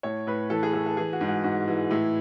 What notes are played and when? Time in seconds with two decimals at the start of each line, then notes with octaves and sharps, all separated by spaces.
0.03 A2 C#5
0.27 A2 B4
0.50 E3 A4
0.63 G#4
0.73 A2 A4
0.86 A4
0.97 E3 G#4
1.13 F#4
1.21 G#2
1.28 F#4
1.43 G#2 F#4
1.68 E3
1.90 A2 E4